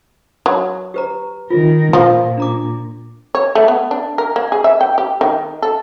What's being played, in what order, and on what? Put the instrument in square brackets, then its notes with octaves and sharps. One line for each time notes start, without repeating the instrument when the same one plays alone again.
[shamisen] F#3
[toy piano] G4 B4 A#5
[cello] D#3 A#4 [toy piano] F4
[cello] A#2 [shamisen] F3 [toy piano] F4
[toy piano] D4 A#5 D6
[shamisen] C#5
A3
B3
D4
A#4
A#3
G#4
E5
G5
G4
D#3
A4